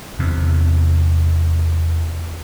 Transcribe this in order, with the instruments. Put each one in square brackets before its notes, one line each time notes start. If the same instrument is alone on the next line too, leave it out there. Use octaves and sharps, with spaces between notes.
[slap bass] E2 C3